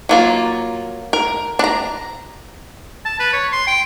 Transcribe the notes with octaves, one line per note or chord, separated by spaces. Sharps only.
F#3 A#3 F4
A#4
D4 A#5
A5
B4
C#5
C6
G5